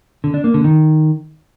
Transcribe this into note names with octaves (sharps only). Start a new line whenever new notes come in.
D3
D4
A#3
D3
D#3